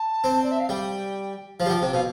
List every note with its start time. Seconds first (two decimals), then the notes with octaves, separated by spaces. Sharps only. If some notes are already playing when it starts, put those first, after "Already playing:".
Already playing: A5
0.24 C4
0.43 D5
0.51 E5
0.60 F5
0.69 G3 G5
1.59 F3 F5
1.66 G3
1.70 F3 G5
1.81 C3 G5
1.93 B2 F5